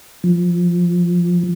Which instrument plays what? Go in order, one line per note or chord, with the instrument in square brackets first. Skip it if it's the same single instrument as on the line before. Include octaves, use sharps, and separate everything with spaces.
[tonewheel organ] F3